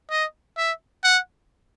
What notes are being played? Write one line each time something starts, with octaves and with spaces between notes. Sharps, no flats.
D#5
E5
F#5